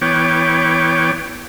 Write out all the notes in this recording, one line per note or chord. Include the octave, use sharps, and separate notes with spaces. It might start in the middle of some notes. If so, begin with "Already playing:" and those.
E3 B3 C#5 G5 D6